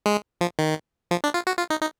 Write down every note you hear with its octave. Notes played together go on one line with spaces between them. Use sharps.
G#3
F3
D#3
F3
D4
F4
F#4
F4
D#4
D#4